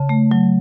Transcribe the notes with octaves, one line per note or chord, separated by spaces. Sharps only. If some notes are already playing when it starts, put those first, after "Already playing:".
Already playing: C#3 A5
A3
F#3